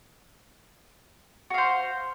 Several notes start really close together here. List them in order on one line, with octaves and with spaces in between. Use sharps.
F#4 F5 C5